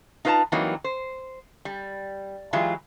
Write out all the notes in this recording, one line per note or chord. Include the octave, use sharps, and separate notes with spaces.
D#4 F4 B4 C5 A5 A#5
E3 F#3 G3 A#3 C4 D#4
C5
G3
E3 F#3 G#3 F4 G4